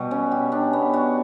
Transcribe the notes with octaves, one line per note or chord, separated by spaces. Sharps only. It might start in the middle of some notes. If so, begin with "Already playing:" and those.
Already playing: B2 G3 F#4
C#4
G4
D4
B3
F#4